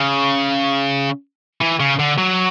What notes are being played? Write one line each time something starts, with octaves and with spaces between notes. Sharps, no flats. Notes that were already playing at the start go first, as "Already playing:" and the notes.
Already playing: C#3
E3
C#3
D3
F#3